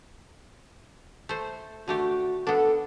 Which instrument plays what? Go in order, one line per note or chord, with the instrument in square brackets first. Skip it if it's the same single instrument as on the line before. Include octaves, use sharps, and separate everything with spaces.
[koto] A3 C5
[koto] D3 A3 G4 [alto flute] F#4
[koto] B3 D4 [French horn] A4 [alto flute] F#5